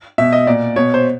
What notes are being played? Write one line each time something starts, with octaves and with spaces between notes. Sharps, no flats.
B2 E5
D#5
A#2 D5
B2 C#5
C5